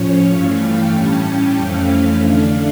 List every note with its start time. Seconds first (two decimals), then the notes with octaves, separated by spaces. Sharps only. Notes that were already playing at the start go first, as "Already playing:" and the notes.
Already playing: A2 F3 C#4 C#5
0.32 G2 E3 A3 F5
0.63 G5
0.94 A2 G3 C#4 A5
1.26 G5
1.57 F2 E3 A3 C#4 F5
2.19 D3 A3 D4